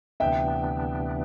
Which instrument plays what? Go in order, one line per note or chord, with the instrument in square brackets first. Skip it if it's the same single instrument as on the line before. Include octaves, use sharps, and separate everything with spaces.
[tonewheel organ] D2 C3 E3 B3 D4 [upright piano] E5 G5